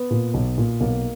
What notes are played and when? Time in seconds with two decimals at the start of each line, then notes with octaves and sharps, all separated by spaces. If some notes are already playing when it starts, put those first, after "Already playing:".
Already playing: B3
0.10 A#2
0.34 B1
0.58 A#2
0.80 B1 A#3